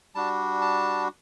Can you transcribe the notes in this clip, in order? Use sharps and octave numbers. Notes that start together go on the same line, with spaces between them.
G3 D4 F#4 A5
A5